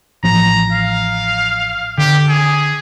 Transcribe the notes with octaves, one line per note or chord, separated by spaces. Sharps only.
A1 F3 A#5
F5
D3 G4
G#4